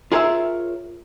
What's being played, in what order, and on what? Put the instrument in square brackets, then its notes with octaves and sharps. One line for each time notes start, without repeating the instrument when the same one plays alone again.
[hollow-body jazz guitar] F4 G#4 A#4 C#5 D5 E5